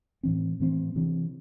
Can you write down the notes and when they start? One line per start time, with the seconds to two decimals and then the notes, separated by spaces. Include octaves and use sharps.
0.23 A2 E3 C4
0.60 A2 E3 C4
0.95 C3 E3 C4